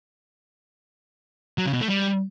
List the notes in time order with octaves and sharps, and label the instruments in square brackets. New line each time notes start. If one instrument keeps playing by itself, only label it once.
[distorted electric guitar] F#3
C#3
B2
A3
G3